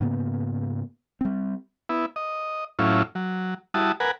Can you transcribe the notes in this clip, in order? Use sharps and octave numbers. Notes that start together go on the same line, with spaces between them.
G#2 C#3 A#3 B3
G3 C4
B3 E4
D#5
A2 F#3 C#4 E4 F4
F#3
G3 E4 F#4 A5 D#6
A#4 B4 F#5 G#5